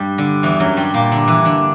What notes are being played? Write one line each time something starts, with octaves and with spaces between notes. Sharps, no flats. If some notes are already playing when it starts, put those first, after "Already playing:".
Already playing: G2 G3
D3
E2 E3
F#2 F#3
G2 G3
A#2 A#3
D3 D4
E3 E4
D3 D4